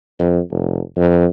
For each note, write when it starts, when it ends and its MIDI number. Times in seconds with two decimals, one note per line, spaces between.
0.19 0.40 41
0.51 0.80 29
0.97 1.26 41